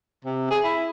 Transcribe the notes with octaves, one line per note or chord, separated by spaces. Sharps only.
C3
G#4
E4